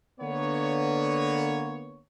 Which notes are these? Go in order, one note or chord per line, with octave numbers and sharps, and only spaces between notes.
D3 A#3 B3 C#5